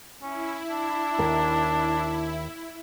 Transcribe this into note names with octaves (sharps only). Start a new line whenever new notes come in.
C#4 E4
D4
D#2 A#4